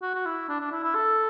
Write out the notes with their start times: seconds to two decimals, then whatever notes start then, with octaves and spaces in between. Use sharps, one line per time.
0.02 F#4
0.14 F#4
0.26 E4
0.49 D4
0.60 D4
0.72 E4
0.84 E4
0.95 A4